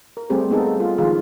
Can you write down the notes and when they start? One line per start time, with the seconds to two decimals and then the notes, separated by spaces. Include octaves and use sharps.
0.17 A#4
0.30 G3 A3 C4 G4 G#4
0.50 A#3 B3 D#4 G#4 A4
0.76 G3 F4
0.98 D#3 F3 G#3 F4 G#4